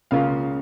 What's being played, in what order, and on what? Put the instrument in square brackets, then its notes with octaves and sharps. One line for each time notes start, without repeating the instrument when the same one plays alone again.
[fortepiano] C#2 C#3 A#3 F4 F5